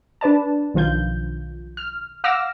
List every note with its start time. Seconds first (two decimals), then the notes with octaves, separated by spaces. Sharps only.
0.21 D4 B4 D5 A5
0.74 B1 D#3 F3 F4 G6
1.77 F6
2.24 F5 F#5 D6 E6 F6 A#6